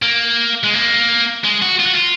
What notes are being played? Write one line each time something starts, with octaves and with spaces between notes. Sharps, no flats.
A#3
G#3
A#3
G#3
F#4
F4
F#4
F4